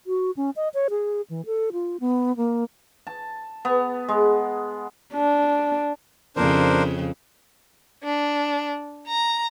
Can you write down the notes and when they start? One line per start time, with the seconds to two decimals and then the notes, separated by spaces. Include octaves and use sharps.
0.07 F#4
0.37 C#4
0.56 D#5
0.74 C#5
0.90 G#4
1.30 E3
1.46 A4
1.73 F4
2.00 B3
2.37 A#3
3.07 A5
3.65 B3
4.09 G#3
5.14 D4
6.36 F2 C#3 D4 A#4 C5
8.04 D4
9.08 A#5